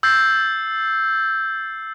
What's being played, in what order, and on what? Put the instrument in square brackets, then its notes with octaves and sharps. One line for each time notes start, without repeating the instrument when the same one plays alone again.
[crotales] E6 G6 A6 C7